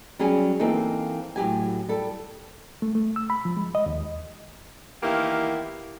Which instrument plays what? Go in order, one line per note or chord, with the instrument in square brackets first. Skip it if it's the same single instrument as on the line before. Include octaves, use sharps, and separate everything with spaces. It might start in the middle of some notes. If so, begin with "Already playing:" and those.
[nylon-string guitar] F#3 G3 C#4 G#4 G#5
E3 A#3 C4 D#4 A4
A2 F#3 G4 G#5
G3 A4
[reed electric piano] A3
A3
E6
B5
F3
G#3
D#5
D#2
[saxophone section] D#3 E3 A#3 B3 E4 G4